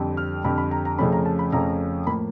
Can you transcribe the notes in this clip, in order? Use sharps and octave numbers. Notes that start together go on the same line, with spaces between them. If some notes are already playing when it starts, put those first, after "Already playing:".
Already playing: F2 D3 G3 C4
F6
F2 D3 G3 C4 B5
B5
A#5
A#5
F2 C#3 F3 A3 C#4 B5
A#5
A5
B5
F2 C#3 F3 A3 C#4 A#5
A2 F3 A#3 B5